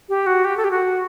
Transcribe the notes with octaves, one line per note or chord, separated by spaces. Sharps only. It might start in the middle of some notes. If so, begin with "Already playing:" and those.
G4
F#4
G4
A4
G4
F#4